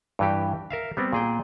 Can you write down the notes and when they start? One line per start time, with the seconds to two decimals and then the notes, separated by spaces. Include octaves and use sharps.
0.19 G2 E3 G4
0.71 A#4 E5 F5
0.97 G3 B3 C4
1.13 A#2 G#4 G5